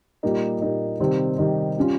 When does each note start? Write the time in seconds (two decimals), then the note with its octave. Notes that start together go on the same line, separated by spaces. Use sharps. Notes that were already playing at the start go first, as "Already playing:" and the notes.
0.23 A#2 G3 A#3 D#4
0.61 A#2 G3 A#3 D#4
1.00 C3 D#3 G3 C4 D#4
1.38 C3 D#3 G3 C4 D#4
1.78 G3 C#4 F4